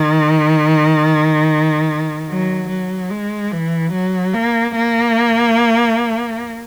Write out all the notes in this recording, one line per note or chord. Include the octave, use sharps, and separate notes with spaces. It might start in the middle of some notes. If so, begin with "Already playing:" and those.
Already playing: D#3
F#3
F#3
G#3
E3
F#3
A#3
A#3